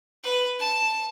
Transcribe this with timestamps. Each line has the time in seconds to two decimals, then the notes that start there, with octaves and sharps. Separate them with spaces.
0.24 B4
0.60 A5